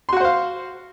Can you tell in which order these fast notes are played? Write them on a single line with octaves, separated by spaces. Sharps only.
C6 F#4 F#5 C5 F5